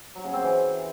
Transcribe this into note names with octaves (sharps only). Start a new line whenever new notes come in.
F#3
C#3
C4
E3